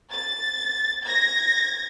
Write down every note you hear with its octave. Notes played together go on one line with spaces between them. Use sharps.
A6
G#6 A#6